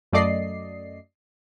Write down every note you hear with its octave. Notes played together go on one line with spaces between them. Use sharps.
F#2 A3 D5 D#5 C7